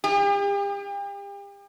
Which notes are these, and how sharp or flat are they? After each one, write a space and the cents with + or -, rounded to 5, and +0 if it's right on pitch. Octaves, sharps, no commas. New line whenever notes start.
G4 +40